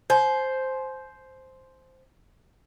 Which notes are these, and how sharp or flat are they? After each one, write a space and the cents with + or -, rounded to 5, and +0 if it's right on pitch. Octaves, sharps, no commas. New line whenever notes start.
C5 +0 G#5 +45